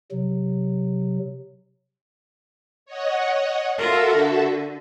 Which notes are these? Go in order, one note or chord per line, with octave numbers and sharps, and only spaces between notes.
C3 F#3
C#5 D#5 F#5
F4 F#4 A4 A#4 E5
D3